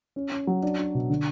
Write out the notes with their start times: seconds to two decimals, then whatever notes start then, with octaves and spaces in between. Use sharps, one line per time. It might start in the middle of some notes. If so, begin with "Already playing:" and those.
0.16 C#4
0.32 C#4
0.47 F#3
0.63 D4
0.78 D4
0.94 B2
1.10 D3